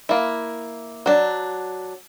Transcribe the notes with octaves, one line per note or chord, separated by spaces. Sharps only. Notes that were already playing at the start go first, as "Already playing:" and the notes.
A#3 E4
F#3 D4